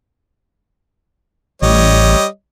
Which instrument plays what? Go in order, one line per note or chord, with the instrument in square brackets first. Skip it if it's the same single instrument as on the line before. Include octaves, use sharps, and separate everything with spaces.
[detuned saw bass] A1 [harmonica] G3 C#5 D#5